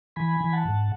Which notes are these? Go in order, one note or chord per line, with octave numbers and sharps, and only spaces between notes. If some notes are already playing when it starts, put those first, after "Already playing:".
E3 G#5 B5
E3
F#5 A5
G#2